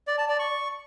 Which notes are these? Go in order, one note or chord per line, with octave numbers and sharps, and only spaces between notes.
D5
A5
D5
C#6